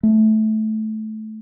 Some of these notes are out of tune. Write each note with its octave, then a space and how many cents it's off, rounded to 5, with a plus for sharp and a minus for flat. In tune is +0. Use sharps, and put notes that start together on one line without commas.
A3 -15